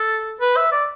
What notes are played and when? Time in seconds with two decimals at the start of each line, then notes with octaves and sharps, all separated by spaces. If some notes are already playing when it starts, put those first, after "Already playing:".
Already playing: A4
0.40 B4
0.57 E5
0.72 D5